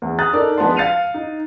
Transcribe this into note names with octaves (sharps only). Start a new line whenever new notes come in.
E2
A#5 D#6 F#6 A6
D4 D#4 A4 A#4 D5
F3 G#3 B3 D4 A5 C6
F5 A6 C7 C#7 D#7 F7
D#4